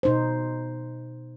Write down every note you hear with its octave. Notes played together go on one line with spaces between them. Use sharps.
B2 D#4 C5